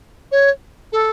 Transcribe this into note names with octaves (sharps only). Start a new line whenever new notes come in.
C#5
A4